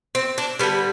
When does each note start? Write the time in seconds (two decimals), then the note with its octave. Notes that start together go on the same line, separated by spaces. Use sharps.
0.15 C4
0.38 D4
0.59 G3 B3
0.63 D3